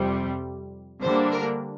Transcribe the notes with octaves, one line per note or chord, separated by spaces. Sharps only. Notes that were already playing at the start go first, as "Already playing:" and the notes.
Already playing: F2 C3 G3
D3 G3 A#3 D4 C5
A#4